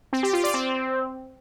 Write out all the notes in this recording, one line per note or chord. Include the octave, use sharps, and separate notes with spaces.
C4
G4
F4
D5
C4